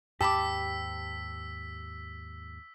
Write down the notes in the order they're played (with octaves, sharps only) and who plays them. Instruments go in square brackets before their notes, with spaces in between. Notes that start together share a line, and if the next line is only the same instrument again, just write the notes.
[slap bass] D#2 G#2 [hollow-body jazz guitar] G4 [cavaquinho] A5 B5 D6 [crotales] E6 B6